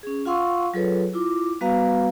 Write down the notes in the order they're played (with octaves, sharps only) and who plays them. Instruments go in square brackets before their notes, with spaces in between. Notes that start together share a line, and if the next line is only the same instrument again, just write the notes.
[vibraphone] C#4 G#4
F4 F5 F#5 C6 C#6 E6
F#3 F4 G#4 A4 B4 C#5
E4 F4 D6
G3 B3 F#4 B4 F5 A#5